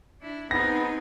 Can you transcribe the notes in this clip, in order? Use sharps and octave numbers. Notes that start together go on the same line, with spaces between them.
D4 E4
B3 C4 D#4 G#4 A#6